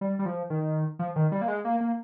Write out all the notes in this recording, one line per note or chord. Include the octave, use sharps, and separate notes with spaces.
G3
G3
F3
D#3
F3
D#3
G3
A#3
G#3
A#3
A#3